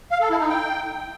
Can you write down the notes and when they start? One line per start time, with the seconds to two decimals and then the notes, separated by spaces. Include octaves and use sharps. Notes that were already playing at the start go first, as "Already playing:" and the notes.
0.11 F5
0.21 A4
0.30 E4
0.40 D#4
0.49 G5